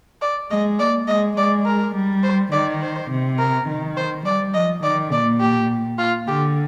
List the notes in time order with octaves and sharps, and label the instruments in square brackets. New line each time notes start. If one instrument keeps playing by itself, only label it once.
[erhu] D5
[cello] G#3 [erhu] D#5
[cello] A#3 [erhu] D5
[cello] G#3 [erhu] D#5
[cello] G#3 [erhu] D5
[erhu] A#4
[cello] G3
[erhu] C5
[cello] D#3 [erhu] D5
[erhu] C5
[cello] C3
[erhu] A#4
[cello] D#3
[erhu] C5
[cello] G3 [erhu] D5
[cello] F3 [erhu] D#5
[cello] D#3 [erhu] D5
[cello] A#2 [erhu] D5
[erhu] G4
F4
[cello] D3 [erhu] G4